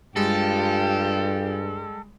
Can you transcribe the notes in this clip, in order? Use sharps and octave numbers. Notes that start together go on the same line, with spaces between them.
G2 G3 G#3 F4 G4 A4